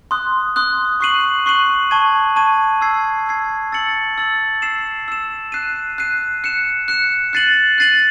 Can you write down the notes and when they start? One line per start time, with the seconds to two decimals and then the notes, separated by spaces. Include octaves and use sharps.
0.11 C6 D#6 F#6
0.56 C6 D#6 F#6
1.00 C#6 F#6 C7 D#7 F#7
1.46 C#6 F#6 C7 D#7 F#7
1.91 A5 C#6 G#6 D#7
2.36 A5 C#6 G#6 D#7
2.81 E6 G#6 C7
3.26 E6 G#6 C7
3.72 E6 A6 C#7 F#7
4.18 E6 A6 C#7 F#7
4.62 E6 C7 E7
5.08 E6 C7 E7
5.52 F#6 C7 D#7
5.98 F#6 C7 D#7
6.44 F#6 C#7 E7
6.88 F#6 C#7 E7
7.33 F#6 A6 C7 D#7 F#7
7.78 F#6 A6 C7 D#7 F#7